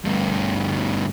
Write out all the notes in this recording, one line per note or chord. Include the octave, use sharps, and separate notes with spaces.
D2 G2